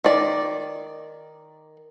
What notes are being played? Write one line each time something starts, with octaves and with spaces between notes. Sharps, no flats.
D#3 D5